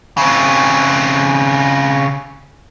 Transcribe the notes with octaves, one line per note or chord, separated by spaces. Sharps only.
C#3 C4